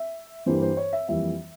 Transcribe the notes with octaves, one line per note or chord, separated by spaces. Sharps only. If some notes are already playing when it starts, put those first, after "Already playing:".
Already playing: E5
G2 E3 G3 A#3 C5
C5
C#5
E5
F2 E3 G3 A#3 E5